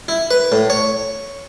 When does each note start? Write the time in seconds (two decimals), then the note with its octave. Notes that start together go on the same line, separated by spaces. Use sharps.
0.08 E4
0.31 B4
0.52 A2
0.70 C#5